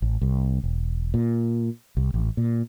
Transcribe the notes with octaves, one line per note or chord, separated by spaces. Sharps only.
A1
C2
E1
A#2
C2
A1
A#2